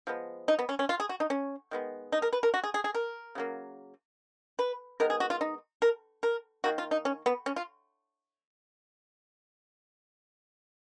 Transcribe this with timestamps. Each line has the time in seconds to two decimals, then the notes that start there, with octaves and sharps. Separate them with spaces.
0.07 F3 G#3 B3
0.48 D#4
0.59 B3
0.69 C#4
0.79 C#4
0.89 F4
1.00 G#4
1.09 F#4
1.20 D#4
1.30 C#4
1.71 D#3 G#3 B3
2.12 D#4
2.22 A#4
2.33 B4
2.43 A#4
2.54 F#4
2.64 G#4
2.74 G#4
2.84 G#4
2.95 A#4
3.35 C#3 F#3 A#3
4.59 B4
5.00 D#3 G#3 B3 A#4
5.10 G#4
5.20 F#4
5.30 F4
5.41 D#4
5.82 A#4
6.23 A#4
6.64 D#3 A#3 F#4
6.78 F4
6.91 D#4
7.05 C#4
7.26 B3
7.46 C#4
7.56 F4